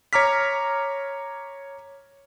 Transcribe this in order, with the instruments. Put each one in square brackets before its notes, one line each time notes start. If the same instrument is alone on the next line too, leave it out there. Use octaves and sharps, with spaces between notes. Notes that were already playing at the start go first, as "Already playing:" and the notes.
[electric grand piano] C#5 A#5 D6 F6 B6